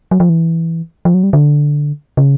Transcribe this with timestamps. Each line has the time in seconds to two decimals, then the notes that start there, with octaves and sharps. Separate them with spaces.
0.11 F#3
0.20 F3
0.29 E3
1.05 F3
1.14 F#3
1.23 G3
1.33 D3
2.17 C#3